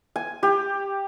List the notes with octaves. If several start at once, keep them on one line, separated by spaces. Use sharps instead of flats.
G#5
G4